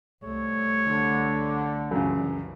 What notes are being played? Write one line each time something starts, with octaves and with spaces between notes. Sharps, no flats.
C2 A3 C#5
D3
C2 F#2 C#3 E3